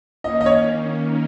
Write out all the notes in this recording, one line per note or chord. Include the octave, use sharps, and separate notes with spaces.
D#3 A#3 C#4 D#5
D#5
C#5